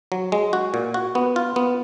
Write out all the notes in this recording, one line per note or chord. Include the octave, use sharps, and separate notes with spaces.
F#3
G#3
F#4
A#2
F#4
B3
F4
B3